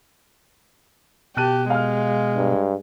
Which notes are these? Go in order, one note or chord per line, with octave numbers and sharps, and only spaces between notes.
B2 G4 A5 F#6 D#7
G#3 F5 F6
G2